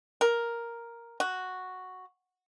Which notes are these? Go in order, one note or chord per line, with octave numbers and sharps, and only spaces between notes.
A#4
F#4